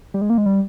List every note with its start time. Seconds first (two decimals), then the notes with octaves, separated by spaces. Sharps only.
0.14 G3
0.21 G#3
0.30 A#3
0.38 G#3
0.46 G3